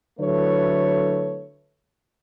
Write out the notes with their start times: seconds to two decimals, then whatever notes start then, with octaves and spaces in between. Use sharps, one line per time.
0.20 D3 F#3 A3 E4 B4 C#5